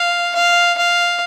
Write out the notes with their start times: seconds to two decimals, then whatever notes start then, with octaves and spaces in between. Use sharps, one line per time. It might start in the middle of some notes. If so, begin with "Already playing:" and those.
Already playing: F5
0.35 F5
0.78 F5